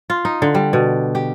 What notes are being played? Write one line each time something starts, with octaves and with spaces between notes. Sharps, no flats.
F4
D#4
D3
G3
B2
G4